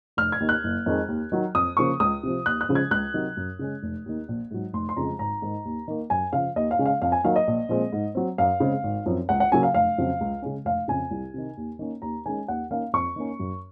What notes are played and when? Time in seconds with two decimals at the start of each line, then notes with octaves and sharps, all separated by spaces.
0.17 F1 F6
0.32 G#6
0.40 D#2 D#3
0.49 F#6
0.64 F#1
0.86 F2 D#3 G#3
1.08 D#2
1.32 D#3 F#3
1.55 F2 D#6
1.77 C#3 F3 A#3 C#6
2.00 C#2 D#6
2.23 C3 F3
2.46 D#2 F#6
2.61 F#6
2.69 C#3 F3 G#3 C#4
2.75 G#6
2.91 C#2 F#6
3.14 C3 D#3 F#3
3.37 F#2
3.59 C#3 G#3 C#4
3.83 F1
4.06 D#2 D#3
4.28 A#1
4.51 G#2 F#3
4.73 F1 C6
4.89 C6
4.97 F2 C#3 F3 G#3 A#5
5.19 G#1 A#5
5.42 G#2 D#3
5.65 D#2
5.88 D#3 A#3
6.10 F#2 G#5
6.33 C#3 F3 F5
6.56 D#2 D#5
6.71 F5
6.79 C#3 G#3 C#4
6.86 F5
7.02 F2 F5
7.12 G#5
7.24 D#3 F#3 A#3 F5
7.36 D#5
7.47 A#1
7.69 A#2 F3 G#3 C4
7.92 G#2
8.15 F#3 C4
8.38 F#2 F5
8.60 C#3 G#3 C4
8.84 G#1
9.06 F#2 F3 C4
9.29 C#2 F#5
9.40 F#5
9.52 C#3 F#3 A#3 C#4 G#5
9.63 F5
9.74 F1 F5
9.98 F2 C#3 F#3 C4
10.21 C#2
10.42 C#3 G#3 C#4
10.65 F1 F5
10.88 F2 C#3 G#5
11.11 C2
11.34 C3 D#3
11.57 D#2
11.79 D#3 A#3 C#4
12.02 D#2 A#5
12.26 D#3 G#3 C#4 G#5
12.48 D#2 F#5
12.71 D#3 A#3 C#4 F5
12.93 F2 C#6
13.16 D#3 A#3 C#4
13.40 F#2